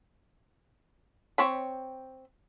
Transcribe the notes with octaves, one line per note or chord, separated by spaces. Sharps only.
C4 C#5 B5